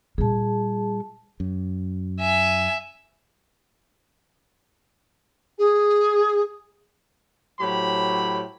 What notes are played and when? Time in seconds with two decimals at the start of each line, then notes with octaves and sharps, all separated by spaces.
0.18 A#2 G3 G#4 A5
1.40 F#2
2.20 E5 G#5
5.58 G#4
7.60 A2 F#3 G4 C5 B5